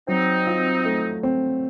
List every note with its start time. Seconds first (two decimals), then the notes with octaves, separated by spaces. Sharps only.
0.08 F#3 C4 D#4
0.47 F4
0.85 A3
1.23 C4